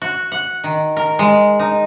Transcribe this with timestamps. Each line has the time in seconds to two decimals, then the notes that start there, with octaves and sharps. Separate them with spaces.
0.02 F#4
0.32 F#5
0.64 D#3
0.97 A#4
1.19 G#3
1.59 D#4